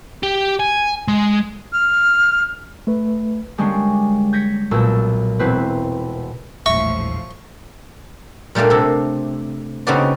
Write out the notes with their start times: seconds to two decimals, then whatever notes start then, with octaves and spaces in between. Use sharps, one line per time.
0.23 G4
0.60 G#5
1.08 G#3
1.73 F6
2.87 A3 B4
3.58 D3 G3 G#3 A#3 C#4 D4
4.33 G6 G#6 A#6 B6 C#7
4.71 B1 A#2 A4 A#4 E6
5.39 E1 B2 C4 E4 B4
6.66 E1 A#1 A2 F3 G3 E5 C#6
8.55 A#2 G3 A3 A#3 D4
8.70 C3 A4
9.87 C#3 B3 C4 D#4 F#4 D5